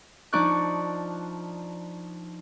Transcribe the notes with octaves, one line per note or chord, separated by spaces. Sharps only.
F3 D4 D#4 D5 C#6 F#6